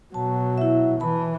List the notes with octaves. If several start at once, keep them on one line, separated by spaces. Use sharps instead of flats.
B2 F#3 A5
E4 E5
E3 A5 B5